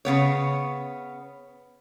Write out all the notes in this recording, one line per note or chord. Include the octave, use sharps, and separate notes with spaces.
C#3 B3 C#5